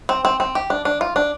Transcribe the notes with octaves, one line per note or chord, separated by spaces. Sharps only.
C4
C4
C4
G4
D4
D4
F4
D4